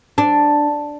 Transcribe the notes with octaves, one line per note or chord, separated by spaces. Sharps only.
D4